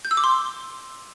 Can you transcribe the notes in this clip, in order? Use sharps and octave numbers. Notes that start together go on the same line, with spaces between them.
G6
E6
D6
C6